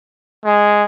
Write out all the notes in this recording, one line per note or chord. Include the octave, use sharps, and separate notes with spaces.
G#3